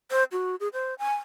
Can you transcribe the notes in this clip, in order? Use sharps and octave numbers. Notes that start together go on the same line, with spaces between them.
C5
F#4
G#4
C5
G#5